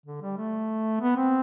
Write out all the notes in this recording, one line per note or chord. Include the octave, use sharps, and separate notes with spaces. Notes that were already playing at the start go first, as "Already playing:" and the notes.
D3
G3
A3
B3
C4